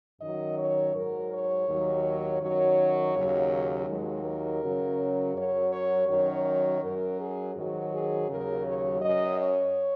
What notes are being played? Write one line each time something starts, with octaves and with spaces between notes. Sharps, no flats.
F#2 D#3 F#3 D#5
C#5
G#2 F#3 A#4
C#5
D#2 D#3 F#3
F#2 D#3 F#3 C#5
D#2 C#3 F#3
D#2 D#3 F#3 G#3
A#4
F#2 C#3 F#3
F#2 F#3 C#5
C#5
F#2 D#3 F#3 C#5
C#5
F#2 F#3 A#4
G#4
G#2 D#3 F#3 F#4
G#4
D#2 C#3 F#3 A#4
C#5
F#2 F#3 D#5
C#5